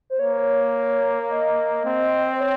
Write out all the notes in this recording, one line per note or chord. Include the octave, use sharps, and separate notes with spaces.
C5
A#3 C#5
D#5
C4
C5
C#5